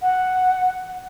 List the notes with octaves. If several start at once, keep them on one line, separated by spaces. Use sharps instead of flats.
F#5